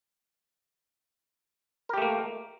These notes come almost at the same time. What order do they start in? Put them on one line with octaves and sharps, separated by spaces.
A#4 G4 A3 A#3